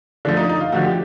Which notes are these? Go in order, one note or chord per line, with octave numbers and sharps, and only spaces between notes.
D3 F3 A3 D4
D#4
D4
D#4
F4
D3 F3 A3 F#4
G4